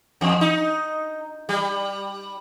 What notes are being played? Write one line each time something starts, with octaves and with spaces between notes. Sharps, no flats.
E2
D#4
G3